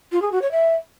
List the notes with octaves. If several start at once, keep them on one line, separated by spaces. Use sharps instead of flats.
F4
G#4
F#4
C#5
E5